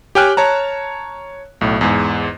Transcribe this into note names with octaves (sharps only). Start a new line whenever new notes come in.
G4 C#5 G5 G#5 F6 F#6
C#5 A5 A#5
B1 A2
E2 G#2